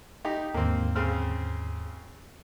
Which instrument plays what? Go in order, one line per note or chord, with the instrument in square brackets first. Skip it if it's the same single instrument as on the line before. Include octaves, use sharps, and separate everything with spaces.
[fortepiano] D#4 G4
[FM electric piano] D#2 G#2 D3 [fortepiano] A#3 C4
[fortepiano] C#3 C4 F6